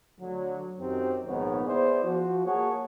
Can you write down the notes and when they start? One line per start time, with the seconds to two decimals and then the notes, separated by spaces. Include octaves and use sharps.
0.19 D2 D3 F#3
0.79 F#2 D#3 F#3 C4 G4
1.26 A#1 G#2 D#3 B3 C#5
1.65 B3 E4 G#4 C5 D5
2.02 F3 F#4
2.45 A#3 G#4 C#5 F#5 A5